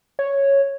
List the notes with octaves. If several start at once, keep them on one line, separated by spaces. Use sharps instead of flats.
C#5